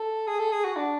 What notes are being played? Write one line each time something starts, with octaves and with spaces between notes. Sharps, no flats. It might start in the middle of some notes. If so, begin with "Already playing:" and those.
Already playing: A4
G#4
A4
G#4
F#4
D4